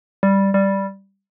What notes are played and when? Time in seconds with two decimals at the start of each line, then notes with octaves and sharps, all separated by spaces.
0.23 G3
0.54 G3